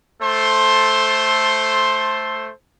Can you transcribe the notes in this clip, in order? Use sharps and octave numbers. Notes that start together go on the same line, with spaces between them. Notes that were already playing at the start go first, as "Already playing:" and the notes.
A3 A4 C5 C6